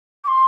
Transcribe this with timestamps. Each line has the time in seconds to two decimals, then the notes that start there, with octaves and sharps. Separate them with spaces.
0.24 D6
0.28 C6